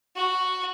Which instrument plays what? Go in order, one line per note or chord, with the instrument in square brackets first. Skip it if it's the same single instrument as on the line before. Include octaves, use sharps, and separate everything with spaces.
[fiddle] F#4